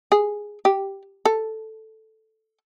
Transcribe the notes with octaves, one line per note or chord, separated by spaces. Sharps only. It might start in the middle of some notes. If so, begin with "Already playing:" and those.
G#4
G4
A4